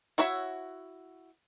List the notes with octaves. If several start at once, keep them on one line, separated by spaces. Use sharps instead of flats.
E4 F#4 C#5 E5